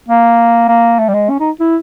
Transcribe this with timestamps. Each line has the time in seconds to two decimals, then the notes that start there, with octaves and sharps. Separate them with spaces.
0.08 A#3
0.68 A#3
0.99 A3
1.09 G3
1.14 G#3
1.30 C#4
1.40 D#4
1.60 E4